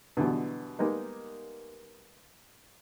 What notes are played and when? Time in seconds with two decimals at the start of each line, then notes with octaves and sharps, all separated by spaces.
0.17 B2 D3 E3 F#3 G3
0.79 G3 G#3 A#3 B3 D#4